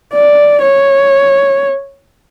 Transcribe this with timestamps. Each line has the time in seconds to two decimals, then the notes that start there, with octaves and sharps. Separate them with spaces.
0.13 D5
0.62 C#5